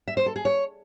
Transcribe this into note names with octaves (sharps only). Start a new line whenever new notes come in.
E5
C5
A4
G#4
C#5